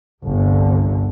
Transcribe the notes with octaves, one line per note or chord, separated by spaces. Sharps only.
G1 C2 D3